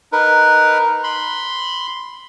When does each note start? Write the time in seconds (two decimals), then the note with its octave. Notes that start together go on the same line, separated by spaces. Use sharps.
0.12 D#4 A#4 B4
1.04 B5 C6